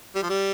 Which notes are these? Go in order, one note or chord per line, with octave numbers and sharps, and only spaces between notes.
G3
F3
G3